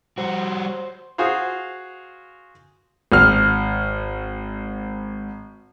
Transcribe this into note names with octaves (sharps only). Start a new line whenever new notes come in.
G3 F#4 C5
F#4 G#4 C5 F5
G#1 F6